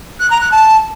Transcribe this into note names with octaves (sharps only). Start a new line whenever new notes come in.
F#6
A#5
F#6
A5